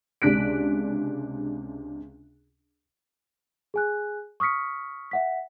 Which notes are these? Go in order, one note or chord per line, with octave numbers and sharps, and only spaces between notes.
C#2 C3 D4 F#6 B6 D7
G#4 G#5 F#6
C#6 D#6 F6 B6 C#7
E5 F#5 B6